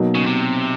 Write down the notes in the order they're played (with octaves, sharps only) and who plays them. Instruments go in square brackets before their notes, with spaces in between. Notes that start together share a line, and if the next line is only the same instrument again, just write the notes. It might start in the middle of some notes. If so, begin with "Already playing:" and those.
Already playing: [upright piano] B2 F#3 A#3 D#4
[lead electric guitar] C#3
C3